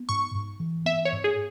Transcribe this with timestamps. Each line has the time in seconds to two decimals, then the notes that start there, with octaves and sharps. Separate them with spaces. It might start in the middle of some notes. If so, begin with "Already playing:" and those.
Already playing: B3
0.09 G#2 C#6
0.35 G#2
0.60 E3
0.85 B3 E5
1.05 C#5
1.12 G#2
1.24 G#4